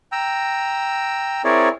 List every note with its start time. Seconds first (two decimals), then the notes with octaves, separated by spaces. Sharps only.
0.12 G5 A#5 E6
1.45 C4 E4 G#4 A#4 C#5 D5